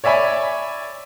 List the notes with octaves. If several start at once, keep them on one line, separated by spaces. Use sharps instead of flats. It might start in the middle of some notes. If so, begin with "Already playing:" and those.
C#5 D5 E5 G#5 B5